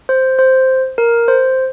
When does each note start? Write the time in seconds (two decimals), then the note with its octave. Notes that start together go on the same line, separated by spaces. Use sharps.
0.09 C5
0.39 C5
0.98 A#4
1.28 C5